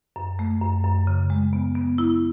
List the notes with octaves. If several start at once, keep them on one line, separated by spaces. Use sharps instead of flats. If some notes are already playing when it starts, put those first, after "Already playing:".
F#2
A3
F#2
F#2
C#3
G#3
B3
B3
E4